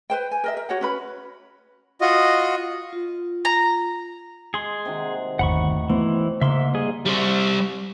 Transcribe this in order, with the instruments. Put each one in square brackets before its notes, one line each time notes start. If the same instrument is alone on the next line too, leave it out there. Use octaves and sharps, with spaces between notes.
[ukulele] B4 C5 G5
G#5
A#4 D#5 E5
A#4
F#4 C#5 F#5
C#4 B4 B5
[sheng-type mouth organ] F4 F#4 D#5
[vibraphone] F4
[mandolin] A#5
[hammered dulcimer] G#3 [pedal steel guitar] G#4 C6
[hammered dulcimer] C3 D#3 F#4
[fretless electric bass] G1 D#2 [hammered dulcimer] A2 D#4 [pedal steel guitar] F#5 B5 C#6
[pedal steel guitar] E3 [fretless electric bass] A3 B3 [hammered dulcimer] C5
[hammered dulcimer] G#2 A#3 [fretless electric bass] C#3 [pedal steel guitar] E5 C6
[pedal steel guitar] G3 G#4 D#5
[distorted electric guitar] G3 C5